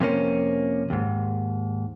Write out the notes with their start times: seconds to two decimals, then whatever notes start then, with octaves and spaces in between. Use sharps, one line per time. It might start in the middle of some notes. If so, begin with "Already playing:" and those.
0.01 F2 C3 A#3 C#4
0.90 D#2 G#2